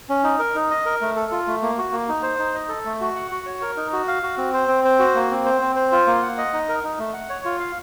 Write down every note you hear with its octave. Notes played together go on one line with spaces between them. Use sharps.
C#4
D#4
A#4
D#4
D#5
A#4
A3
A4
F4
A3
A#3
F#4
A#3
D#4
C5
D#4
D#5
A4
A3
F#4
F#5
F#4
C#5
A#4
D#4
F#4
F5
F#4
C4
C5
C4
C5
F#4
A#3
C4
C5
C4
C5
F4
A#3
F#5
D#5
D#4
A#4
D#4
A3
F#5
C#5
F4
F5